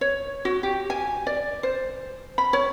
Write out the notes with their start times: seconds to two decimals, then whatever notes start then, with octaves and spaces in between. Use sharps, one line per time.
0.01 C#5
0.45 F#4
0.63 G4
0.90 G#5
1.27 D5
1.63 C5
2.38 B5
2.53 C#5